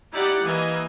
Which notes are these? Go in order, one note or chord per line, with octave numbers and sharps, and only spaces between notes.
D#4 E4 G4 D5 F#5
E3 A#3 D#5 G#5